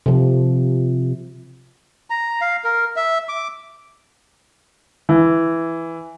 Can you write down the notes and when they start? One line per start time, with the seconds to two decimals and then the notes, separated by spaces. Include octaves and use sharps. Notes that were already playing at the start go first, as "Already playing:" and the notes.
0.06 C3 F3
2.10 A#5
2.41 F5
2.64 A#4
2.96 E5
3.29 D6
5.09 E3